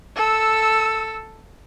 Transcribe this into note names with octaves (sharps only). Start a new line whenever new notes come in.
A4 E6